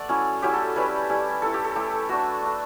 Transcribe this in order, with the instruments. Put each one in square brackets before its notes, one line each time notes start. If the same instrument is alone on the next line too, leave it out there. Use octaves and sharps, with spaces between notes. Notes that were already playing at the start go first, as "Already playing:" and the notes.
Already playing: [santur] A3 D5 F#5
F#3 C#4 E4
F#3 C#4 E4 G4
A4
G3 C#4 E4 B4
G3 C#4 E4
A3 E4 A4
G4
A4
A3 E4 G4
A3 D4 F#4
A3 D4